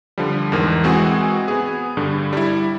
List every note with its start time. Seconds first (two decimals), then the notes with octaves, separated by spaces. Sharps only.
0.18 D3 F3 G3
0.52 E2 G#2 A#4
0.83 E3 G#3 C4 F#4 G#4
1.48 B3 G#4
1.97 G2 D3 G3
2.33 G3 E4